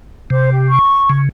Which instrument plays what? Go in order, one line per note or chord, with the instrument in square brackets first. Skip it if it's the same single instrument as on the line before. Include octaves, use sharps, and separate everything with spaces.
[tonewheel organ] C3 [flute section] C5 D6
[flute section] G4
C#6
[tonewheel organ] C#3